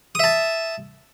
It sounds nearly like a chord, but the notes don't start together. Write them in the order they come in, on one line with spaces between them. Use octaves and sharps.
D#6 E5 A5